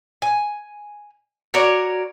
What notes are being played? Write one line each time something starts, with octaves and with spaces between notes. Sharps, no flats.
G#5
F#4 A#4 C#5 D5